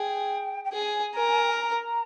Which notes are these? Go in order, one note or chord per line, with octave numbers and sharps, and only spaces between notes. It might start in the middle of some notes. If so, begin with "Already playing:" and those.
Already playing: G#4 G5
G5
G#4 G#5
A#4
A#5